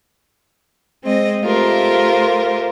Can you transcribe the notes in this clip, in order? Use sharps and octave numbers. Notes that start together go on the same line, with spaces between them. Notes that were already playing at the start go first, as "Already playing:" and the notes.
G#3 C4 D#5
A3 F4 G4 A#4 C5